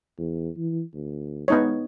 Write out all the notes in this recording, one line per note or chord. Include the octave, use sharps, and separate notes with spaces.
E2
E3
D2
G#3 B3 D#4 C#5